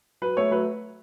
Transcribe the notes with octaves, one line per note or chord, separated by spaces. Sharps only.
F#3 B4
A3 C#5
F#3 B4